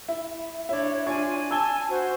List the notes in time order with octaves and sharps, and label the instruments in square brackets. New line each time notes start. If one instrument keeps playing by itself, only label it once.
[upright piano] E4
[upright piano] D4 E4 [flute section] C#5
[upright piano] D4 C#6 G#6 [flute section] F4 C#5 G#5
[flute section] G#5 A5 [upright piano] E6 G#6 G7
[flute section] F#4 C5